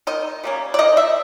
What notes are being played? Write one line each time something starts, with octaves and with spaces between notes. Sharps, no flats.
D#3 D#5
G3 A#3 C#4
D5
D#3 D#5
E5